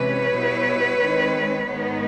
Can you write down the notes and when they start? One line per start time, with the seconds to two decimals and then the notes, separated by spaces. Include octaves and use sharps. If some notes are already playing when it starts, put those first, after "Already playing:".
Already playing: C3 E3 G#3 C#4 B4 C#5
0.36 B2 G3 B3 E4
1.02 D#3 G#3 C4
1.68 G#2 D#3 G#3 B3 D#4